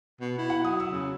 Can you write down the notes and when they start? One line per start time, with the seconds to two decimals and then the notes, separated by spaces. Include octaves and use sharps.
0.21 B2
0.38 E4
0.50 F#5
0.64 F#3 D#6
0.80 E6
0.91 C#3